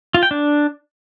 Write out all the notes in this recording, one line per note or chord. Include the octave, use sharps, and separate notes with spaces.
F4
G5
D4